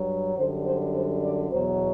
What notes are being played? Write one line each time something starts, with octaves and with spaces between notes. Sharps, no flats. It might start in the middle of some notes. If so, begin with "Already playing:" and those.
Already playing: G2 F#3
F#2 D3 G3 C5
C5
C5
D5
E2 B2 F#3 C5